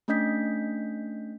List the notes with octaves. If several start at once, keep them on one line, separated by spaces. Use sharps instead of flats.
A3 C#4 D4 D#5 G6 B6